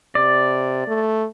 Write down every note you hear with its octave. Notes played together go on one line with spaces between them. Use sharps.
C3 D5
A3